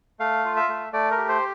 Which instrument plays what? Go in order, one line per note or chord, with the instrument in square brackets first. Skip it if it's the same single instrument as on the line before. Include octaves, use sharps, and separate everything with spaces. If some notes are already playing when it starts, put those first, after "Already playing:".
[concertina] A3 F5
F4
E5
A3
A3 D5
A#4
G4
C5